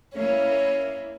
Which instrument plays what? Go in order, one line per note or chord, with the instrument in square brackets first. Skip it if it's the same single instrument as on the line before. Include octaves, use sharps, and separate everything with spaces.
[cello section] A#3 E4 [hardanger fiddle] C#4